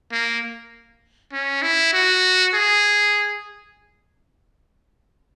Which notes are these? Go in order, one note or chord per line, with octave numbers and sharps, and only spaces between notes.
A#3
C#4
E4
F#4
G#4